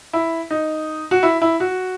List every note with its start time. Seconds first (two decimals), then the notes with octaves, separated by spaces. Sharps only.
0.13 E4
0.51 D#4
1.11 F#4
1.23 E4
1.42 E4
1.60 F#4